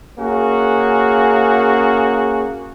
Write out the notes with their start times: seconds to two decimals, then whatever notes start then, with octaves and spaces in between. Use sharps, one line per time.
0.19 A#3 C#4 F#4 G#4